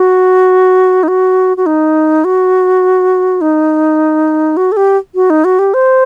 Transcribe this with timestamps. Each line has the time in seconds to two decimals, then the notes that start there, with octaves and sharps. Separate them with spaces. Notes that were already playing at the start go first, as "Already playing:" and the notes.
Already playing: F#4
1.03 D#4
1.08 F#4
1.57 F#4
1.66 D#4
2.24 F#4
3.41 D#4
4.57 F#4
4.72 A4
4.77 G4
5.15 F#4
5.30 D#4
5.44 F#4
5.59 G4
5.74 C5